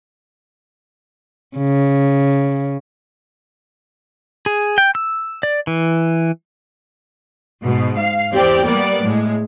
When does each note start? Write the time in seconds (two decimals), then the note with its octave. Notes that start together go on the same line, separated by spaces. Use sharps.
1.57 C#3
4.46 G#4
4.78 G5
4.95 E6
5.43 D5
5.67 E3
7.63 G#2 B2
7.98 F5
8.33 E2 C4 G4 D5 G5
8.66 G3 A#3 B3 D5
9.03 A2 G#3